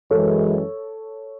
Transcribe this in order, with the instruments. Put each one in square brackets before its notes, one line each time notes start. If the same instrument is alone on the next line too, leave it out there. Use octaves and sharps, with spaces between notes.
[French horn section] F#2 E3 G#3 [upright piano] A4 C#5